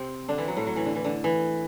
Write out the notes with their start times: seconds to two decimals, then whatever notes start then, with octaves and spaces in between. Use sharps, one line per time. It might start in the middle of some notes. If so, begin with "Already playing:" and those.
Already playing: C3 C4
0.28 D3 D4
0.38 E3 E4
0.48 F#3 F#4
0.57 A2 A3
0.67 F#3
0.76 E3
0.86 D3
0.95 E3
1.04 D3
1.24 E3